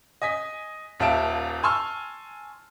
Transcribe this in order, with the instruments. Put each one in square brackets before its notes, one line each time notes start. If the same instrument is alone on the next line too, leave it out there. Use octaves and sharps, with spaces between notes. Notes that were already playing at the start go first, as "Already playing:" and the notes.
[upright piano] D#5 G#5 D#6 B6
D#1 D#2 E5 F5 A5 D7
G#5 A5 C6 C#6 E6 F6